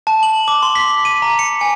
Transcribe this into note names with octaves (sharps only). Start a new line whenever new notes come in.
A5
F#7
D6
C6
B6
D#7
A#5
C#7
G#5